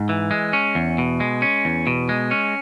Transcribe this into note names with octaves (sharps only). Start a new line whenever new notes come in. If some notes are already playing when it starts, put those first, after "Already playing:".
Already playing: G#2
E3
G#3
C#4
E2
B2
G#3
C#4
E2
B2
G#3
C#4